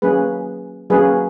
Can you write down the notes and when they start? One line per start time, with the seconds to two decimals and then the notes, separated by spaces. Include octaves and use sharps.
0.02 F#3 A#3 C#4 G#4 B4
0.90 F#3 A#3 C#4 G#4 B4